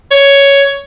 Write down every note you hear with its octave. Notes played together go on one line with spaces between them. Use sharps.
C#5